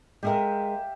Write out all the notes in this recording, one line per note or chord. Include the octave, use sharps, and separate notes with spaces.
G#3 G4 G#4 A#4 E5 F5